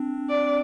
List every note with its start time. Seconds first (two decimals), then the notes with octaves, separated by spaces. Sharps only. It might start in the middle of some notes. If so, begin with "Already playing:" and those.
Already playing: C4 D4
0.29 D5